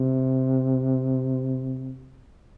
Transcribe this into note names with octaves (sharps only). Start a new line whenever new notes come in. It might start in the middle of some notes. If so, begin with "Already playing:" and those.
Already playing: C3